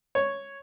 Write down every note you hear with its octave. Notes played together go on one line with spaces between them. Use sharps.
C#5